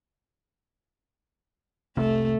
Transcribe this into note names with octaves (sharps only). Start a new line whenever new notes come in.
F1 C2 C3 A3